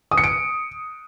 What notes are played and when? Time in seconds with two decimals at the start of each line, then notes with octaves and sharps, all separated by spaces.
0.11 D#6
0.18 C#7
0.24 D7